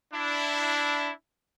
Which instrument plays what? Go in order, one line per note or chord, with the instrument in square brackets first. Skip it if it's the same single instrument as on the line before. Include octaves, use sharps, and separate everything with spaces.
[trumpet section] D4 E4